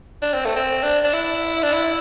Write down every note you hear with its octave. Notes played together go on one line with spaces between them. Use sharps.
D4
C4
A3
C4
D4
D4
E4
D4
E4